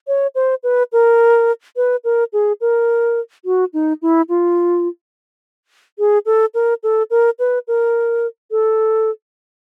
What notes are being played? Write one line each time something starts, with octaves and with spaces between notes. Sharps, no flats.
C#5
C5
B4
A#4
B4
A#4
G#4
A#4
F#4
D#4
E4
F4
G#4
A4
A#4
A4
A#4
B4
A#4
A4